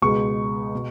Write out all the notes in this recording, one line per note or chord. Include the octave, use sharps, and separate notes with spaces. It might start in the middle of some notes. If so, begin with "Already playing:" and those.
C#2 B2 G#3 C#6
B2